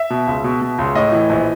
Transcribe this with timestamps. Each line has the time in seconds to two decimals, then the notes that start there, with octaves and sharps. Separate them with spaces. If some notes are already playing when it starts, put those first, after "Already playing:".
Already playing: E5
0.10 B2
0.27 C#2
0.44 B2
0.61 B2
0.78 C#2
0.95 A2 D#5
1.12 E3
1.30 A#1